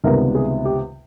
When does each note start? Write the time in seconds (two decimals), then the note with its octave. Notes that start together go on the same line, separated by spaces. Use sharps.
0.04 C#2 C3 D#3 G3 B3 A#4
0.35 G#4
0.65 G4